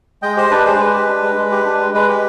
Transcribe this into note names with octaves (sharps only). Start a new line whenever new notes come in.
G#3 D#5 G5
G4 C5 D#5
D4 B4 D5
G#3 G#4 C5
G#3 B4
G4
D4
G#3
G#3
G4
D4
G#3
G#3 B4
G4